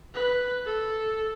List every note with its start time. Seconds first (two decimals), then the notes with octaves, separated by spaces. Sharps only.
0.14 B4
0.66 A4